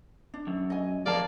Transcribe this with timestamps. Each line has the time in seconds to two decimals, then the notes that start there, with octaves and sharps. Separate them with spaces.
0.34 D4
0.47 F#2
0.70 D#5 G#5
1.06 F2 A#3 A#4 D5 F5 A5